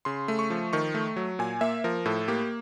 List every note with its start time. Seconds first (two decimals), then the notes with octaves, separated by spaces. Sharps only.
0.05 C#3 C6
0.28 A3
0.39 C#6
0.50 F3
0.73 D#3 C#6
0.94 A3
1.16 F#3
1.39 A#2 G#5
1.61 A#3 E5
1.84 F3 A#4
2.05 A2 A4
2.28 A#3 G4